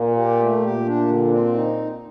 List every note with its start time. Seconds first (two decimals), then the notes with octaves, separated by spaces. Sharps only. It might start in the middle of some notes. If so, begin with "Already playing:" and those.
Already playing: A#2
0.16 G4
0.40 A3
0.63 A#2 G4
0.85 D4
1.08 D3
1.30 C4
1.54 D#4